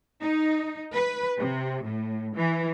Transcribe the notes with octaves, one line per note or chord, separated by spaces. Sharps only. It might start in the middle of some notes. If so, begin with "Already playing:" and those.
D#4
B4
C3
A2
E3